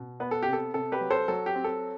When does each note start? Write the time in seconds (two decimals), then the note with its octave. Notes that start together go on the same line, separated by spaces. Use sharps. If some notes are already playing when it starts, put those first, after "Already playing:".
Already playing: B2
0.20 B3 B4
0.31 A4
0.43 C3 G4
0.53 A4
0.74 C3 A4
0.92 G4 B4
1.01 F#3
1.10 A4 C5
1.28 F#3 A4
1.46 G4
1.55 C4
1.64 A4